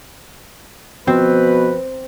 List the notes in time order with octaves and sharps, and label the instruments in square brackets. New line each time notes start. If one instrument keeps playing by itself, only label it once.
[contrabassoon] B2 [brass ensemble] F3 B4 [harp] C4